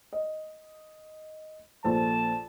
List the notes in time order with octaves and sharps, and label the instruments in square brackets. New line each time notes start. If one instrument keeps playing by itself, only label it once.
[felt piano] D#5
[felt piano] A#1 A4 C5 [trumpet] A5